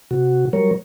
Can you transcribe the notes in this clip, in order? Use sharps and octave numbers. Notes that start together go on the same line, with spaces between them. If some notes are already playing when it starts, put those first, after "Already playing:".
C3 F#4
F#3 G3 A#4 C#5